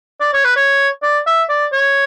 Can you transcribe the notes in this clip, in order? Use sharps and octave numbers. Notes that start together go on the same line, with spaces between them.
D5
C#5
B4
C#5
D5
E5
D5
C#5